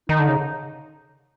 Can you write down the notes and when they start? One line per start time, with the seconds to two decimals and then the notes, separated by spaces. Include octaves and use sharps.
0.09 D#3 D#4
0.19 D3
0.28 C#3